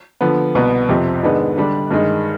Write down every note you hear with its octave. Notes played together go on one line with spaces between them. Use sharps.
D3 F3 B3
C2 B2 B3
F2 C3 F3 C4 G4
G#2 D#3 G#3 B3 D4
D3 G3 D4
G2 D#3 G#3